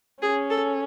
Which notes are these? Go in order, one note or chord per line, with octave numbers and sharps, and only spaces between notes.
C#4 G#4
A4